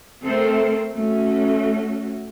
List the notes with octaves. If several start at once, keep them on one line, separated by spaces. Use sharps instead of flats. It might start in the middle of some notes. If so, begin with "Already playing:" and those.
A3 C4 A4 A#4 C5
A3 C#4 F#4